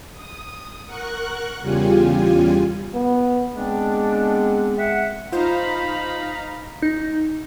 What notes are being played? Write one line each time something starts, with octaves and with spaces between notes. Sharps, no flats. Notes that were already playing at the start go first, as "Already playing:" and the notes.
D#6
A#4 F#5 C#6 F#6
E2 C#3 G3 F4 G4 G#5
B3
G#3 B3 C4 D4
E5 F#5
D#4 F4 C5 F5 A#5 B5
D#4